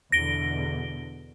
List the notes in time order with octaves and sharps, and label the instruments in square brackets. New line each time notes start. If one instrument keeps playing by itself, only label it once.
[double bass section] E2 B2 D3 [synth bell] A#6 D7 G7